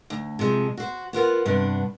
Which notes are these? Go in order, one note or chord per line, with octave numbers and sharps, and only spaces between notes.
D2
C3 F3 G#3
F#4 C5
B3 F4 A#4 F#5
G2 C3 B3 D4